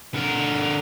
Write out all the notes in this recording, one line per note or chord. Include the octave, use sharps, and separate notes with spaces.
D3 A#4